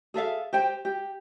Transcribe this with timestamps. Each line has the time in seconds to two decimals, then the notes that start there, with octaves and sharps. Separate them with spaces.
0.14 G#4 A4 E5 F5
0.53 G4 C5 G5
0.85 G4